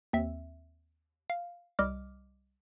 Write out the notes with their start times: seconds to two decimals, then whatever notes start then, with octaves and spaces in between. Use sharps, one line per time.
0.13 D#2 C4 E5
1.30 F5
1.79 C2 G3 D#5 D6 F6